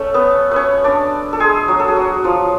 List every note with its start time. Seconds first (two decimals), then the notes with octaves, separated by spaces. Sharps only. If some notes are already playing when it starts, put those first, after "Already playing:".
Already playing: A3 C#4 A4 C#5
0.14 B3 B4
0.51 C#4 B4 C#5
0.84 D4 D5
1.33 A4
1.40 G#3 G#4
1.68 F#3 F#4
1.79 A4
1.88 G#4
1.96 F#3 F#4
2.24 F3 F4